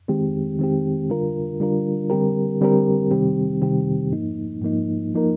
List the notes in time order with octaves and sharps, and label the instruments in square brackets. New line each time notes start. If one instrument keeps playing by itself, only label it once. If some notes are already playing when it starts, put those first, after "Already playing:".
[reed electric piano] D#3 G#3 C4 G4
D#3 G#3 C4 G4
D3 G3 D4 F4 A#4
D3 G3 D4 F4 A#4
D3 G3 C4 G4 A#4
D3 G3 C4 G4 A#4
C3 D#3 G3 C4 G4
C3 D#3 G3 C4 G4
G#2 F3 A#3 D#4
G#2 F3 A#3 D#4
F3 A#3 D#4 A#4